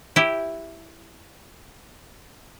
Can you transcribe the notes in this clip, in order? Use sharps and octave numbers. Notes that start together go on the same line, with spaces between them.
E4 G4